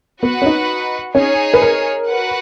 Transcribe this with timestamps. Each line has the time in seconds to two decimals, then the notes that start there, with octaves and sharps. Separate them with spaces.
0.22 B3 F#4 B4 F#5
0.42 C#4
0.46 D#4
1.14 C#4 D#4 G#4 C#5 G#5
1.54 B4
1.62 A#4
2.07 F#4 B4 F#5